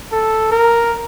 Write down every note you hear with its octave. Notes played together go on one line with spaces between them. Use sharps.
A4
A#4